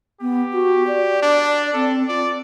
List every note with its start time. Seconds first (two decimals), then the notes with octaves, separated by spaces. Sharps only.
0.21 B3 G4
0.52 F#4
0.87 D5
1.22 D4
1.73 C4 A4
2.08 F4 D5